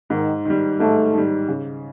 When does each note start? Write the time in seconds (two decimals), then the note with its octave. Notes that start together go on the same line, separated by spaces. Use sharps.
0.10 G#2 D#3
0.45 D#3 G3
0.79 G#2 A3
1.14 D#3 G3
1.48 C#3